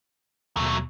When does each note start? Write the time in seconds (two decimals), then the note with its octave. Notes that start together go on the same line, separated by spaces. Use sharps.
0.57 D#2 B2 F#3 A3